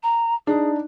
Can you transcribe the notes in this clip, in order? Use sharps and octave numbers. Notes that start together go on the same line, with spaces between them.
A#5
D4 D#4 G#4